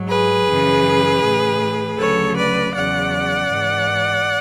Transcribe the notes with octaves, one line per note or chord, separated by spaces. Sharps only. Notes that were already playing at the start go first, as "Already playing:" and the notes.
Already playing: G#2 F#3
G#4 B4
F#2 C#3 E3
A2 E3
D2 C#3 F#3 A4 C#5
B4 D5
E2 C#3 F#3 D5 F#5
G#2 E3